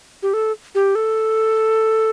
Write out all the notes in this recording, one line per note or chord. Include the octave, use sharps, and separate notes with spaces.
G4
A4
G4
A4